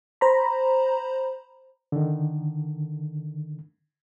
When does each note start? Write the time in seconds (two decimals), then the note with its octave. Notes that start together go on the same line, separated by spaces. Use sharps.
0.21 C5 A#5 B5
1.92 D3 D#3